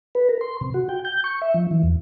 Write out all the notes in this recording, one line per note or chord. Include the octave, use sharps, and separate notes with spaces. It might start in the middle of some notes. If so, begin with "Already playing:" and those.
B4
A#4
C6
C3
F#4
G5
G6
C#6
E5
F3
E3
E2